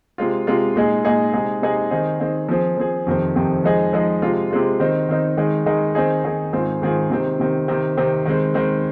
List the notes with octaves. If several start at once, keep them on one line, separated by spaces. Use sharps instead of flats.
C3 G#3 F4
C3 G#3 F4
A#2 G#3 D#4 G#4
A#2 G#3 D#4 G#4
C3 G#3 D#4 G#4
C3 G#3 D#4 G#4
D#3 C4 D#4 G#4
D#3 C4 D#4 G#4
F3 C4 G#4
F3 C4 G#4
F2 C3 D#3 C4
F2 C3 D#3 C4
F3 G#3 D#4 G#4
F3 G#3 D#4 G#4
C3 G#3 F4
C3 G#3 F4
D#3 C4 D#4
D#3 C4 D#4
D#3 G#3 D#4 G#4
D#3 G#3 D#4 G#4
D#3 C4 D#4 G#4
D#3 C4 D#4 G#4
G#2 D#3 C4 F4 G#4
G#2 D#3 C4 F4 G#4
C3 D#3 C4
C3 D#3 C4
C3 D#3 C4
C3 D#3 C4
D#3 G#3 C4
D#3 G#3 C4